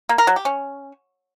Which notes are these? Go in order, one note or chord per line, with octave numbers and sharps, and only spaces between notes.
A#3
A#4
F#3
G4
C#4